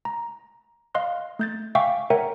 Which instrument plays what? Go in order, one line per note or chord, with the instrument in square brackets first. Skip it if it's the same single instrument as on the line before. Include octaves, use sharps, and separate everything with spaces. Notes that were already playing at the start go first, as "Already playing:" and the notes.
[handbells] A#5
D#5 F5 C6 F6 F#6
A3 G6 A6
E5 F5 G5 G#5 C#6 D6
A#4 C#5 E5 F#5 G5 A#5